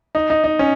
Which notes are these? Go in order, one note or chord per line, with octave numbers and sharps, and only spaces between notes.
D#4
D#4
D#4
C#4